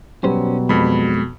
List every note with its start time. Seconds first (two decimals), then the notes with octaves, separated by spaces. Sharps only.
0.24 B2 F#3 G3 C#4 B4 C5
0.69 F2 G#3 B5